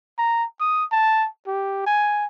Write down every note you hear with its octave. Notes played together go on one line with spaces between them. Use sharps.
A#5
D#6
A5
G4
G#5